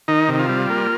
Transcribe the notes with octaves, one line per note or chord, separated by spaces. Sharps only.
D#3 D#4
C3
F4
G3
A#3